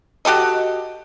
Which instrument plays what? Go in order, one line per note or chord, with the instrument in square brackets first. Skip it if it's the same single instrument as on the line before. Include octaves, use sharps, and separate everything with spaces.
[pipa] F#4 G4 A4 D#5